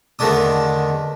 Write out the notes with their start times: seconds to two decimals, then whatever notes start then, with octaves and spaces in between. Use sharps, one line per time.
0.19 E2 D3 D#3 A3 D4 D#6